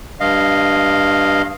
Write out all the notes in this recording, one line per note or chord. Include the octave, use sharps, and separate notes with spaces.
G2 D#5 F5